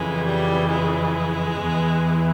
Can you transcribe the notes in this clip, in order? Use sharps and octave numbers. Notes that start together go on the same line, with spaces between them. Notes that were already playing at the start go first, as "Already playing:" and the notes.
Already playing: F2 C#3 E3 G#3
G3
G#3
E2 E3